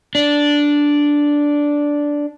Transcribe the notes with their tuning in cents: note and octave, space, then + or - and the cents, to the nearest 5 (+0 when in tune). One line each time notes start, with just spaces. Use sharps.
D4 -5